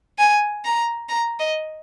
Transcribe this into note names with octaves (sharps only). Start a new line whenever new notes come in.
G#5
A#5
A#5
D#5